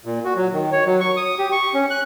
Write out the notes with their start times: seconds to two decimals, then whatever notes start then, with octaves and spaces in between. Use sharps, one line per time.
0.05 A#2
0.25 F#4
0.36 F#3
0.53 D#3
0.72 C#5
0.86 F#3
1.00 C#6
1.17 D#6
1.39 G4
1.52 C#6
1.74 C#4
1.90 F#6